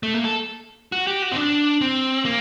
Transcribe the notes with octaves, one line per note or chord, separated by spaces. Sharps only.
A3
A#3
A4
F#4
G4
F#4
C4
D4
C4
A#3